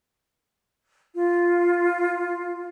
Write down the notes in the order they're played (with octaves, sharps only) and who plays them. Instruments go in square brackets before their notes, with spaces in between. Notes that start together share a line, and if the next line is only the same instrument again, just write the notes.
[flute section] F4